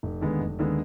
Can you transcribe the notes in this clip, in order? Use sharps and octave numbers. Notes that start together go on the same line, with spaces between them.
F1
D#2 D3 G#3 B3
F1
D#2 D3 G#3 B3